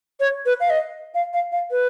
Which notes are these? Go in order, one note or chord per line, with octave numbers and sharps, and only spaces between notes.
C#5
B4
F5
D#5
F5
F5
F5
B4